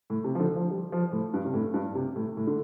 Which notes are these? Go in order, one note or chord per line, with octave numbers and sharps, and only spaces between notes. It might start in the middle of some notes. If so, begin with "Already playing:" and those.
A2
C3
F3
D3
F3
G3
F3
A2
G2
C3
A2
G2
C3
A2
A2
D3